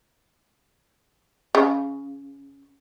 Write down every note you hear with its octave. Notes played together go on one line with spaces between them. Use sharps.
C#3